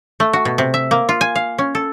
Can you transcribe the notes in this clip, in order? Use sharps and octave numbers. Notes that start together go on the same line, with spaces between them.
A3
F#4
B2
C3
E5
A#3
F4
G#5
F5
C#4
A4